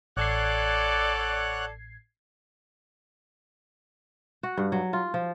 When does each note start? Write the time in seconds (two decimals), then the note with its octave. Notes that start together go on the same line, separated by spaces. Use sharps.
0.17 A1 A4 C#5 D5 F#5 F#6 G#6 C7
4.43 F#4
4.57 G2
4.72 F#3
4.93 F4
5.14 F3